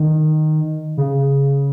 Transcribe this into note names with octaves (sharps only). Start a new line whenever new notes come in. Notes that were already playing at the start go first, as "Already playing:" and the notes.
Already playing: D#3
C#3